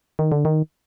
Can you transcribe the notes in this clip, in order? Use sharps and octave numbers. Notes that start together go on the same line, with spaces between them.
D#3
D3
D#3